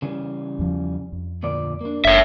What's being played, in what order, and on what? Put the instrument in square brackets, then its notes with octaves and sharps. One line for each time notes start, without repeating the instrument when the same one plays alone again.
[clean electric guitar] C#3 E3 G3
[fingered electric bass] E2 F3
F2
[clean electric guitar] D2 A#2 D5
A#3 D4
[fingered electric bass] F#1 [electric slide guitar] C#5 E5